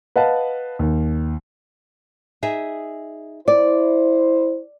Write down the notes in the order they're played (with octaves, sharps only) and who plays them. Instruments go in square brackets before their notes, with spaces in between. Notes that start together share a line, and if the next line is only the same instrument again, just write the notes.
[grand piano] B4 D#5 F5 F#5 A5
D#2
[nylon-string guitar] D#4 G#4 E5
[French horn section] E4 C5 [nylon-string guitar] D5